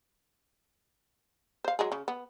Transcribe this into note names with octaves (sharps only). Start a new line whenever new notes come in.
C5 F5
F#3 G#3 G#4
C#3
B3